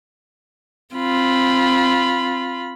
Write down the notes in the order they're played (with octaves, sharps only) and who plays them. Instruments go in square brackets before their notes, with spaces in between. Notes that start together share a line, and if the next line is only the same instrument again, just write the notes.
[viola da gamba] C4 [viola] F4 B5